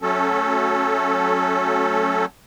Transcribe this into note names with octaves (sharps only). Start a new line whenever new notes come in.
F#3 A3 C#4 A4